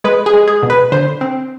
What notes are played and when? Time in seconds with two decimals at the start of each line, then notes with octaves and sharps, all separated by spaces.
0.04 G#3 B4
0.26 G#4
0.33 G#3
0.48 G#4
0.63 B2
0.70 B4
0.92 D3 C5
1.21 C4